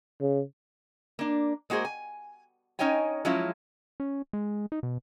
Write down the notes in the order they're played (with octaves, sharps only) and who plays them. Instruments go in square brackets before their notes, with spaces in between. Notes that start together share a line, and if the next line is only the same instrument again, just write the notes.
[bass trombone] C#3
[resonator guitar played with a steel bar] A#3 D4
G#3 A#3 F#4 G#4 C5
G#5
C#4 D#4 C#5 D#5 G5 G#5
F3 F#3 G#3 C#4 E4 F4
[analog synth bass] C#4
G#3
D#4
B2